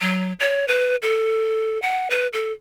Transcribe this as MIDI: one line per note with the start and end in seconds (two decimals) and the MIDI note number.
0.01 0.33 54
0.40 0.65 73
0.68 0.96 71
1.02 1.80 69
1.82 2.08 78
2.10 2.28 71
2.33 2.52 69